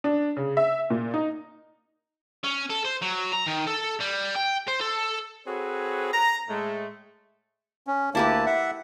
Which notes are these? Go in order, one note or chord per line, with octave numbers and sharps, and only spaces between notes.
D4
C#3
E5
A#2
D#4
C#4
A4
C5
F#3
A#5
D#3
A4
G3
G5
C5
A4
C4 F#4 G#4 A4 B4 C#5
A#5
A2 G#3 A3
C#4
D2 A#3 E4 G4 B4 A5
E5 F#5